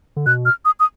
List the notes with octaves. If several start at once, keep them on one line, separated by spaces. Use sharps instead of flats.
D3
B2 F#6
F6
D#6
D#6